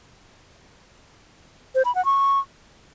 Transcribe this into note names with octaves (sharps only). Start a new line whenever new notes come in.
C5
B5
F#5
C#6